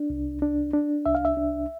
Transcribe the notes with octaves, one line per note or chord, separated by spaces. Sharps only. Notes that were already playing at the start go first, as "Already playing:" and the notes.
Already playing: D4
C2
D4
D4
C2 E5
F5
E5
D4